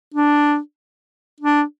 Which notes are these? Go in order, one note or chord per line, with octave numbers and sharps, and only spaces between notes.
D4
D4